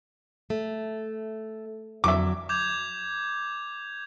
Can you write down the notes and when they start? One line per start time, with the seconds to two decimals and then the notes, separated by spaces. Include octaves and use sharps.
0.50 A3
2.04 F2 D3 F#3 E5 D6
2.49 D6 G6 G#6 F7